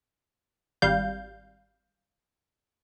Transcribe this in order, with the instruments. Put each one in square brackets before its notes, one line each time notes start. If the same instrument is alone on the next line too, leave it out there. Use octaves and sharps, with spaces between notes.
[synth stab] G#1 G3 F5 G6